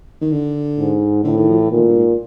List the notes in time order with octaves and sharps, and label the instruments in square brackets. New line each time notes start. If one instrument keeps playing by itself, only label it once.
[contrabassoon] D#3
D3
[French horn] G#2
[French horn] A2 [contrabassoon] D3
[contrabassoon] D#3
F3
E3
[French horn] A#2 [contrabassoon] D#3
[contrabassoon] A2
G2
G#2